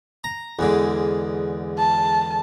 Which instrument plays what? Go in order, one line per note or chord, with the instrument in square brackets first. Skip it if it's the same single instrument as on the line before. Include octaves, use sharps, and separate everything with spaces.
[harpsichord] A#5
E2 G#2 D3
[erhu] A5